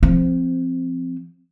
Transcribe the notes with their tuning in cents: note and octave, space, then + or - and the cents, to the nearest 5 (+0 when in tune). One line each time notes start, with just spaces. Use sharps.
F3 -15 C4 +0